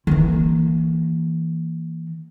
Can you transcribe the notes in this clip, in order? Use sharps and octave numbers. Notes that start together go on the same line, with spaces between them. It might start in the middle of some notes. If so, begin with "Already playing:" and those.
E3 A#3